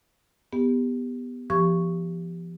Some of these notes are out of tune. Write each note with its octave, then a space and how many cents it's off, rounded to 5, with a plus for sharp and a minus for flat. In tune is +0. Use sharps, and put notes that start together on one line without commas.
B3 +0 G4 +20
F3 -30 G4 +0 C#6 +0